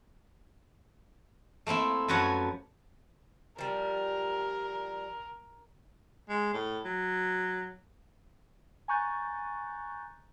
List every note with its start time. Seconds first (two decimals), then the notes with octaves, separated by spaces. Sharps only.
1.67 A3 A#3 C4 E4
2.08 F#2 F3 F#4 B4 C#5 F#5
3.58 F3 G3 A#4
6.29 G#3
6.54 A2
6.85 F#3
8.88 G#5 A#5 C#6 F#6 G6 A6